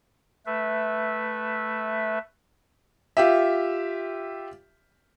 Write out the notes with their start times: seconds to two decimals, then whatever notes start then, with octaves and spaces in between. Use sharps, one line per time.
0.46 A3 B4 E5
3.17 F4 G4 E5